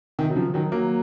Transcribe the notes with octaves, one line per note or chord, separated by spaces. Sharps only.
C3 D#3
F#3
C#3 F3
D#3 F#3
F#3 A#3